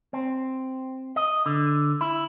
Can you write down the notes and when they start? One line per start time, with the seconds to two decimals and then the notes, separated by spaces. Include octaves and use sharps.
0.13 C4
1.16 D#5
1.46 D3
2.01 E4